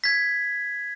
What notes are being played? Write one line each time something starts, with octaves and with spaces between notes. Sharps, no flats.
G#6 B6